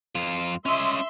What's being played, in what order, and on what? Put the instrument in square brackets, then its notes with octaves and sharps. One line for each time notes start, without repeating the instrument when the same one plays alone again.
[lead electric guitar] F2 F4
[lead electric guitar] C#4 D#5 [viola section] E5 C6